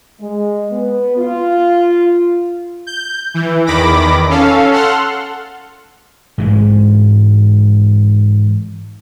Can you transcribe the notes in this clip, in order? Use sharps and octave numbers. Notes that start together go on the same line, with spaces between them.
G#3
B3
F4
G6
E3
E2 D#3 B5 D6 A#6
C#4 A4 F5
A4 F#5 C6 F6
G#2 E3 G#3